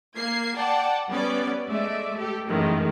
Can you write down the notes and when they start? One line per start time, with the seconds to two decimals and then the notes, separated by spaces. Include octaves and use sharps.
0.16 A#3 G#6 C7
0.57 D5 F#5 G5 A5
1.09 G3 B3 C#4 B4 D5
1.69 G#3 A3 D5 E5
2.18 G4 A4
2.49 F#2 A2 D#3 E3 G#3